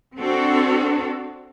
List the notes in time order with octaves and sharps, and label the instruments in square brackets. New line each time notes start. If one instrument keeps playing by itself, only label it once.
[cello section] C4 D4 F#4 A4